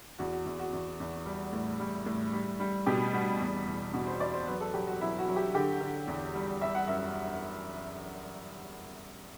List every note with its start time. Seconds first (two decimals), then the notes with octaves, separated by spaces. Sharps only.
0.19 E2 F#4
0.32 F#4
0.46 E2
0.59 F#4
0.73 E2
1.00 E2
1.26 G3
1.53 A2
1.80 G3
2.06 A2
2.33 G3
2.60 G3
2.86 B2 G4
3.13 G3 F#4
3.40 E2
3.67 E2
3.93 B2 F#4
4.06 C5
4.20 E2 D5
4.33 C5
4.47 F#3 B4
4.61 A4
4.74 F#3 G4
4.87 F#4
5.01 F#3 E4
5.18 F#4
5.28 F#3
5.36 G4
5.54 D3 G4
5.81 D3
6.07 E2
6.35 G3
6.61 G3 E5
6.75 F#5
6.88 F#2 E5